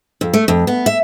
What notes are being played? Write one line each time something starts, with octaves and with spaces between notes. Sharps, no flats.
F2
A3
F2
B3
E5